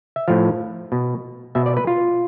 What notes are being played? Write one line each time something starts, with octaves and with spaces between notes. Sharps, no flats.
E5
A2 F3 F5
B2
B2 E5
D5
B4
F4